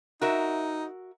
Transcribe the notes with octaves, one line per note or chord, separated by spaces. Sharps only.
D#4 F#4 A#4 E5